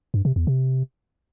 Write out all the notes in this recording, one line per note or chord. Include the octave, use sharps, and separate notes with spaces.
G2
C3
E2
C3